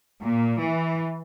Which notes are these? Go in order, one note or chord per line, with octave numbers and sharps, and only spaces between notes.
A#2
E3